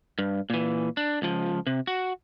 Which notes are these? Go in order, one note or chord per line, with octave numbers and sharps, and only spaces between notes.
G2
A#2 E3
D4
C#2 F3
C3
F#4